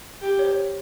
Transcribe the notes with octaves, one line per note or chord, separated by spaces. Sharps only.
G4
C#5
C5